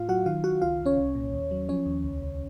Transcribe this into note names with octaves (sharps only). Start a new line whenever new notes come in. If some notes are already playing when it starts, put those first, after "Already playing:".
Already playing: A2 F4 F5
F#3 F#4 F#5
D#3 F4 F5
D#3 F#4 F#5
C#2 F4 F5
C#2
C#4 C#5
C2
A#2
D#2
F#3
F3 C#4 C#5
D#2
C#2
C#2